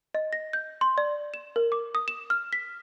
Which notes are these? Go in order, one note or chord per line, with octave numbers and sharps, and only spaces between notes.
D#5
A#6
G6
C6
D5
E7
A#4
D6
D#6
E7
F6
B6